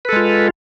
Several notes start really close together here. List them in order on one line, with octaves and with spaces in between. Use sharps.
B4 A4 G#3 F4